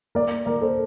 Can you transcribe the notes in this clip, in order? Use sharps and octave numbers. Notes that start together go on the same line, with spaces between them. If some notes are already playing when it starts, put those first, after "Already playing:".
A#3 A#4 D5
A#3 A#4 D5
A4 C5